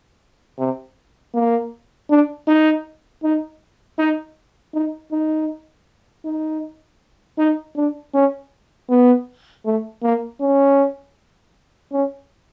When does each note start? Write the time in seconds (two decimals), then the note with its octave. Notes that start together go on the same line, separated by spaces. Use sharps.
0.59 C3
1.34 A#3
2.10 D4
2.48 D#4
3.23 D#4
3.99 D#4
4.74 D#4
5.12 D#4
6.25 D#4
7.38 D#4
7.76 D4
8.14 C#4
8.90 B3
9.65 A3
10.03 A#3
10.41 C#4
11.92 C#4